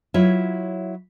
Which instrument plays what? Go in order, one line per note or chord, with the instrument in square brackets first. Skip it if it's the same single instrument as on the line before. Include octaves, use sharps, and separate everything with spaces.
[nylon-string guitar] F#3 E4 F4 C#5 E5